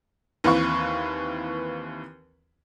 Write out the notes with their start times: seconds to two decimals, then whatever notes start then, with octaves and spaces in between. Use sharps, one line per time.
0.44 D#2 E3 C4 B4 F5 C#6